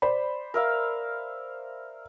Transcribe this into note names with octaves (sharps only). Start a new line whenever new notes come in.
C5 D5 B5
A#4 E5 F5